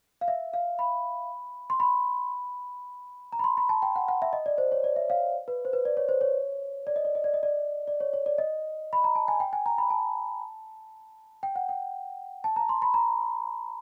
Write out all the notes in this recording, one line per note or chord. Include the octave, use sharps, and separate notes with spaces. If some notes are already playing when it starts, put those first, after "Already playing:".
F5
E5
F5
B5
C6
B5
A#5
B5
C6
B5
A5
G5
F#5
F#5
E5
D#5
D5
C5
C#5
D5
E5
F5
B4
C5
B4
D5
C#5
C5
C#5
D5
D#5
D5
D#5
D5
D#5
D5
D5
C#5
C#5
D5
D#5
B5
A#5
A5
G#5
G5
G#5
A#5
B5
A5
G5
F#5
G5
A5
A#5
C6
B5
A#5